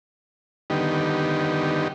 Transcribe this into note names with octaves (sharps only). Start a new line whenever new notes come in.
D3 D#3 G3 B3 D#4 G4